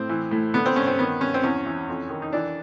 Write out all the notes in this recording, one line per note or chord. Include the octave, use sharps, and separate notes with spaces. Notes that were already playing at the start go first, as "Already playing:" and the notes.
Already playing: A2 C4
E3
A2
D3 B3
C4
G2 C#4
C4
D#3 B3
G2 C#4
C4
E2 C#4
E3
F2
D#3
D#4
E3 D4